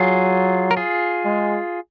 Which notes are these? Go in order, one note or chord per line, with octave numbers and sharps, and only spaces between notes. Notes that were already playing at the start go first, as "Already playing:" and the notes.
Already playing: F#3 F4 G#4
A#4
F4 G#4
G#3